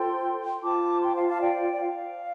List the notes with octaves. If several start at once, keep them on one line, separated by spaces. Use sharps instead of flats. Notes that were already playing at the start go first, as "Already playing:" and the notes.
Already playing: F4 A4 C5 G5 C6
F4 C5 A5 D6
G5 C6
F5 A5
F5 A5
D5 G5
D5
F5